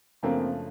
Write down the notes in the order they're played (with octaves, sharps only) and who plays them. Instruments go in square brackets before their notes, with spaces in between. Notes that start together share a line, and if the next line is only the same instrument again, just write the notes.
[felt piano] F#2 C#3 F3 A3 D4 [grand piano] A#3 C4